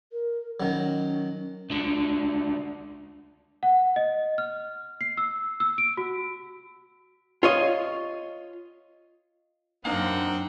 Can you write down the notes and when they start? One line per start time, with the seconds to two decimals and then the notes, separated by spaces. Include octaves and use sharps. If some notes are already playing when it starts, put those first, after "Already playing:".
0.12 A#4
0.60 D#3 F#3 C#4
1.71 C#2 D3
3.63 F#5
3.96 D#5
4.38 F6
5.01 C7
5.17 E6
5.60 E6
5.78 D7
5.97 F#4
7.43 F4 C#5 D#5
9.85 F#2 A#3 C4 D4 D#4 F#5